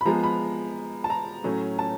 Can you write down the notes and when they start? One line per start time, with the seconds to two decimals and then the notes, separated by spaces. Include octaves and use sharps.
0.01 B5
0.05 F3 G#3 B3 A#5
0.24 B5
1.04 A5
1.10 A#5
1.44 A2 F#3 A3 C#4
1.79 A5